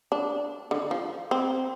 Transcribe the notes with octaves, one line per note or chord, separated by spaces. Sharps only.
D4
D3
F3
C4